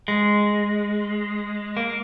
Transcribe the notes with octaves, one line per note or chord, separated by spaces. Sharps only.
G#3
A#3